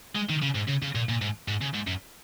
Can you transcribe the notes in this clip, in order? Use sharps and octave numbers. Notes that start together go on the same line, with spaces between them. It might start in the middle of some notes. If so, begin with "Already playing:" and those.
G#3
D#3
C#3
G#2
C#3
C#3
A#2
A#2
G#2
G#2
C#3
G#2
F#2